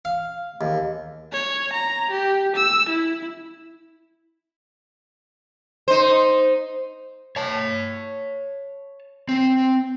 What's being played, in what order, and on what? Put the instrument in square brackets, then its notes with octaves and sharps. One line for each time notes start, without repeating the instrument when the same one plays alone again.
[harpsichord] F5
D#2
[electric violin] C#5
A#5
G4
E6
E4
[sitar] D#4 C5
[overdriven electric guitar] C#5 A5
C4